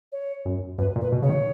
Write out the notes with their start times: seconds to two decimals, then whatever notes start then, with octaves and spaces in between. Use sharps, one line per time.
0.12 C#5
0.45 F#2
0.78 F#2 B4
0.96 A#2
1.01 B4
1.12 B2
1.22 C#3 C#5
1.29 D#3